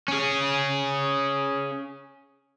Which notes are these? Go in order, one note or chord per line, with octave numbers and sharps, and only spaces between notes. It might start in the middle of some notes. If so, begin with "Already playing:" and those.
C#4 G#4